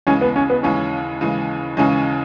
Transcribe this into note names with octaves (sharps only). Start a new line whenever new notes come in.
D#2 C#3 E3 G#3 C#4
B3
C#4
B3
D#2 C#3 E3 G#3 C#4
D#2 C#3 E3 G#3
D#2 C#3 E3 G#3 C#4